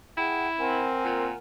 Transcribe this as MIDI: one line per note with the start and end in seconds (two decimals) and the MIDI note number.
0.17 0.89 64
0.17 0.48 68
0.17 0.48 78
0.17 0.48 79
0.58 1.30 60
0.58 1.37 70
0.58 1.37 78
0.58 1.37 80
1.04 1.33 46